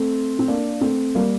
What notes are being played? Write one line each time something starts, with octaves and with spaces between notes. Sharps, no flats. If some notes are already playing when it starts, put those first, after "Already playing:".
Already playing: A3 C4
C4
A#3 D4
A3 C4
G3 A#3